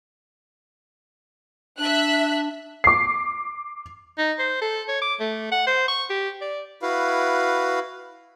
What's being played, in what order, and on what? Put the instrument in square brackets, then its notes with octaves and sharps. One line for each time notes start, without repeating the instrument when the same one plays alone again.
[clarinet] D4 [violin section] E5 F#6
[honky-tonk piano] D6 C7
[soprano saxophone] D#4
C5
A4
C#5
D6
A3
F#5
C5
C#6
G4
D5
[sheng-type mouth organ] E4 F#4 B4 F5